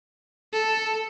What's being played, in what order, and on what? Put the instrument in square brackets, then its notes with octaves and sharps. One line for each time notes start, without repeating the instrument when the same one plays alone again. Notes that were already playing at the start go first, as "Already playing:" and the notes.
[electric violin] A4